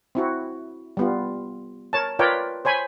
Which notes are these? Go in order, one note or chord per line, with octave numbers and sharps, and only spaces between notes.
C4 E4 F#4
G3 B3 F4
A#4 C#5 A5
F4 A#4 B4 C#5 D5 G5
C5 C#5 G#5 B5